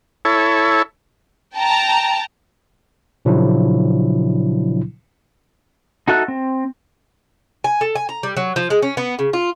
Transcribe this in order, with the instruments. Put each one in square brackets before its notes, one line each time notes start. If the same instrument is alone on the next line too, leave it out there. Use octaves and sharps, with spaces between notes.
[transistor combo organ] E4 A4 C#5
[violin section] G5 A5 A#5
[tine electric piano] A#2 C#3 F3 F#3 D4 E4
[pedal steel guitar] D#4 F#4 A4 E5 F#6
C4
[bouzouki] G#5
A4
G#5
A#5
G3
F#3
F3
G#3
C#4
B3
C#3
F4